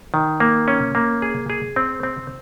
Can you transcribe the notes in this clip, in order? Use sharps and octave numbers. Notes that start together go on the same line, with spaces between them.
D#3
A#3
C#4
A#3
G#4
G#4
C4
C4